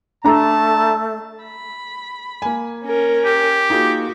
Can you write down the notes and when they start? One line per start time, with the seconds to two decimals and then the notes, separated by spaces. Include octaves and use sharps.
0.25 A3 D4 A5 A#5
1.44 B5
2.42 A#3 G#5
2.85 C#4 A#4
3.25 G4
3.70 A#3 D#4 F4 F#4 G#4